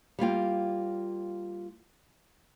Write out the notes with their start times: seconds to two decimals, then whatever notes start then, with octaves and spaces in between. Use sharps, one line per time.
0.19 G3 A#3 F4 G5